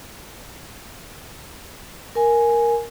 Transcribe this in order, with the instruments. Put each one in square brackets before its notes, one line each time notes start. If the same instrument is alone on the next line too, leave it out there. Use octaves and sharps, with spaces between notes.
[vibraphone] A#4 G#5